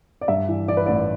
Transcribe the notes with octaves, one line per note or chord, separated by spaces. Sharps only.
D5
G2 E5
E3
E3 D5
B4
A1 D5